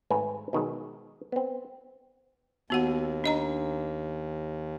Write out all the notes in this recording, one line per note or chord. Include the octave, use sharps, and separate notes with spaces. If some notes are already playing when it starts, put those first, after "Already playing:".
G#1 G#2 A3 B4 C#5 G#5
B2 D#3 F#3 G#3
B3 C4
D#2 B3 F#4 F#5
D4 D#5 A#5